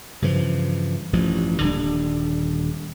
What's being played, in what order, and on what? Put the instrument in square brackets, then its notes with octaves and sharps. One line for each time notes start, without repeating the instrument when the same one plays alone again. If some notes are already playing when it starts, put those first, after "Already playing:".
[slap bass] G2 C#3 E3 F3
A1 G2 F3
D#1 D3 G3 D4